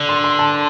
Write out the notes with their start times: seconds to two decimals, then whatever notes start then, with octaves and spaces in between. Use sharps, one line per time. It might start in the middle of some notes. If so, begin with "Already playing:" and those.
Already playing: D3
0.09 C6
0.24 C6
0.39 A5